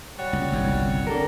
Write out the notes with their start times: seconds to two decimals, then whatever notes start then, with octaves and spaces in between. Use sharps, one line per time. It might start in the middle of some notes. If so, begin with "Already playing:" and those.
0.18 G3 F#4 C#5
0.33 C#2
0.52 G1 C2 F#2
1.07 D4 A4 A#4